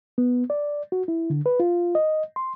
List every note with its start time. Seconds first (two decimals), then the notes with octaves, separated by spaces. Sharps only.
0.18 B3
0.50 D5
0.92 F#4
1.08 E4
1.30 D3
1.46 B4
1.60 F4
1.95 D#5
2.36 C6